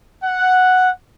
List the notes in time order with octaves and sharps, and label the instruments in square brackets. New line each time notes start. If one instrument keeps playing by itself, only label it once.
[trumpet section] F#5